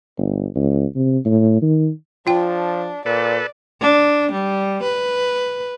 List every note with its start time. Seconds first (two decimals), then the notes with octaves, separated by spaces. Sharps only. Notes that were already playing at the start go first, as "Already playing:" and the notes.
0.18 G1
0.55 C#2
0.95 C3
1.25 A2
1.62 D#3
2.27 F3 D4 F4 G5
3.06 A#2 A4 B4 D5
3.81 D4
4.31 G3
4.83 B4